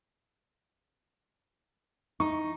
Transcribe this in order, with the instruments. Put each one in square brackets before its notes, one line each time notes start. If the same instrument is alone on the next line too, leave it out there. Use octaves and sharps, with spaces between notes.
[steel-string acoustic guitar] D#4 [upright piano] C#6